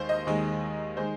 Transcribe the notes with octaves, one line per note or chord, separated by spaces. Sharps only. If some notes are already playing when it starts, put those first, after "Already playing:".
Already playing: D#2 D#3 G#3 C5
D#5
D#2 D#3 G#3
D#3 G#3 C5